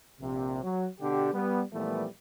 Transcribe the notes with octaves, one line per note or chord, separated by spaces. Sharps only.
A#1 C3
F#3
B2 D3 D4 G4
G3 B3
A#2 E3 F3 G3 A3 B3